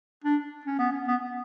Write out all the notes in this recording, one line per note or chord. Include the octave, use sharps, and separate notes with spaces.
D4
C#4
B3
C#4
B3